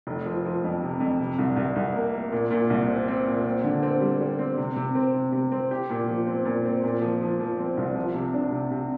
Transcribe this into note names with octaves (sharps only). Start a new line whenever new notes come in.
F1
F3
F3
F2
C3
F2
C3
C2
C2
C2
A#3
A#3
A#2
A#2
C2
C4
C4
A#2
C4
D3
C4
G3
G3
C4
C3
C3
C4
C3
C3
C4
G4
A#2
F3
C4
A#2
C4
A#2
F3
F3
F3
C4
C2
F3
C3
D4
C3
C3